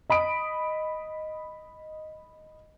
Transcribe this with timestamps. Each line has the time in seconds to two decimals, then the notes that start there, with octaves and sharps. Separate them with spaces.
0.10 D#5 B5 D#6 D7